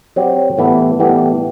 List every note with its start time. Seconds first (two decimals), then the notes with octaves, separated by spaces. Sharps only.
0.16 F#3 C4 G4 D5
0.58 A2 E3 G3 B3 E4
0.99 A2 E3 G3 B3 E4